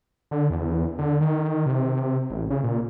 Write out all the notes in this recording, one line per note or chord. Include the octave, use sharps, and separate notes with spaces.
D3
E2
D3
D#3
C3
A1
C#3
A#2